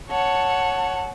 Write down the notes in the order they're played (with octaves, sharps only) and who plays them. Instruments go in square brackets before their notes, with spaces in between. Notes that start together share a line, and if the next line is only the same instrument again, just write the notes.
[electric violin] C#5 F#5 [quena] A5